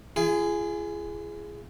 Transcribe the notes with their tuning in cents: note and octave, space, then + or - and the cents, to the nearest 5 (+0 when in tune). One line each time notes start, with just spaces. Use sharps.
F4 -45 G#4 +0